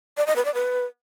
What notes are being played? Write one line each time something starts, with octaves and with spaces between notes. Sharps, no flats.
D5
D#5
B4
D5
B4